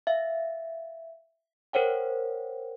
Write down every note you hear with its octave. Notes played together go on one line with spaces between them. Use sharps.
E5 F5
A#4 C5 C#5 F#5 G5